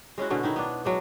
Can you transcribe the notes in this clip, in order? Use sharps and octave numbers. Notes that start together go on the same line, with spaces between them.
G#3 C#4 E4 F#4
B2 D3 C#4
D#3 D#4 E4
B3 D4
F#3 G#3 D4